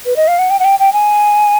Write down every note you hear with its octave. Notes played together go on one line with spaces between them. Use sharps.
B4
D#5
F5
F#5
G5
F#5
G5
G5
G#5